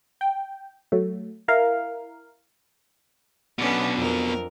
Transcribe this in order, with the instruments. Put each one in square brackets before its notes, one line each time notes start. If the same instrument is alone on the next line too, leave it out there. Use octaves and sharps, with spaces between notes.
[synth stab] G5
F#3 A3
E4 A#4 F5
[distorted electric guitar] B1 B2 [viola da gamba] B3 C#4 D4
[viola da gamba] F2 A#4